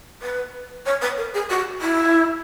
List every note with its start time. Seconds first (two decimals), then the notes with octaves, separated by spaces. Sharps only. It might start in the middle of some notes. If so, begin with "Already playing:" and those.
0.22 B4
0.86 C#5
1.02 B4
1.18 A#4
1.34 G#4
1.50 F#4
1.81 E4